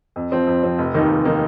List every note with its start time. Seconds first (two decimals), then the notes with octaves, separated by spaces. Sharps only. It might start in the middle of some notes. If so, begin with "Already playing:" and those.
0.16 F2
0.31 F3 C4
0.47 F2
0.63 F3 C4
0.78 F1
0.94 D#2 D#3 A#3 D#4
1.10 F1
1.25 D#3 A#3 D#4